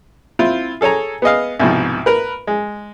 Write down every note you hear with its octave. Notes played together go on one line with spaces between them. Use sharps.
C4 E4 F4
G#4 A4 C#5 G#5 A#5
B3 G#4 D#5 F5
C2 G#2 B2 F3
A#4 B4
G#3